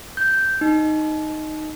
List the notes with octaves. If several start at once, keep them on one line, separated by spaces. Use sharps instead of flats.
G6
D#4